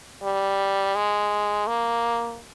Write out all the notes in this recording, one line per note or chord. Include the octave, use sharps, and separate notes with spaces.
G3
G#3
A#3